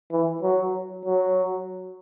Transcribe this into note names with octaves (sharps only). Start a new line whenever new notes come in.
E3
F#3
F#3